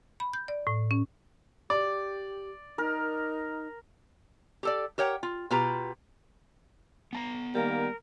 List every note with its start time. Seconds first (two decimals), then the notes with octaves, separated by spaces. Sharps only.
0.20 B5
0.33 G6
0.48 D5
0.67 A2
0.91 C#4
1.70 G4 D5
2.78 D#4 A#4
4.63 G4 A4 D5
4.98 G4 A#4 C#5 F#5 G5
5.23 F4
5.51 B2 F4 G4 B4 A#5
7.13 B3 A5 A#5
7.54 D#3 G3 A#3 A#4